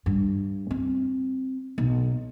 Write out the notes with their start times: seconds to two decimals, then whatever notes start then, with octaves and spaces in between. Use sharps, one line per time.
0.06 G2
0.71 C4
1.78 B1